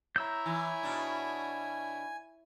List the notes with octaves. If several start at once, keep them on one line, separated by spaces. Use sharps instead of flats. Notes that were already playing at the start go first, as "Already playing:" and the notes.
E4 C#5 A#5 E6 G6
E3 G#5
B2 D4